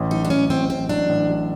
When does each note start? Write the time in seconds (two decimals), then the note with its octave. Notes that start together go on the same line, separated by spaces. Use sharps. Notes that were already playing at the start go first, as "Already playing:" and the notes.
Already playing: A1
0.11 F#3 D#4
0.25 D4
0.30 A1 C#4
0.50 A1 C4
0.69 A1 C4
0.89 F#3 D4
1.09 A1
1.29 F#3